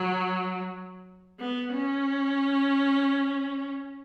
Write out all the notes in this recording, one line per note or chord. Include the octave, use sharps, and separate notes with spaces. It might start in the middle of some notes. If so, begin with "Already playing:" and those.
Already playing: F#3
B3
C#4